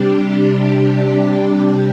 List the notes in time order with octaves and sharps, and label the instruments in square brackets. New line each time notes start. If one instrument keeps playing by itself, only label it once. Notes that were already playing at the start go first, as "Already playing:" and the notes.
Already playing: [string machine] C3 G3 D4 G4